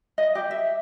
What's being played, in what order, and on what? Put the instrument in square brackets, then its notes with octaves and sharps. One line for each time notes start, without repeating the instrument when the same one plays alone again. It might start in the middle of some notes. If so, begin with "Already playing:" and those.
[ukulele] D#5
G4
E5